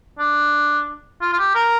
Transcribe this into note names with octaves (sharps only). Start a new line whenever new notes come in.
D4
F4
F4
G4
A#4